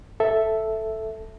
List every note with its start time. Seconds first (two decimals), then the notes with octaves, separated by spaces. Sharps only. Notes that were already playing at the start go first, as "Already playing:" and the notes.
0.20 A4 E5